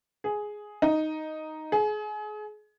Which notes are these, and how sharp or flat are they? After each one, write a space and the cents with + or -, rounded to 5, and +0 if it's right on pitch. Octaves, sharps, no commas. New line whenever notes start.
G#4 +5
D#4 +0
G#4 +30